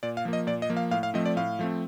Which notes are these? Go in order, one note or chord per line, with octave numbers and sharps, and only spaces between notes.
A#2 D5
F5
F3 A#3
D#5
A#2 D5
D#5
F3 A#3
F5
A2 F5
F5
F3 A3 C4 D#5
D5
A2 F5
F3 A3 C4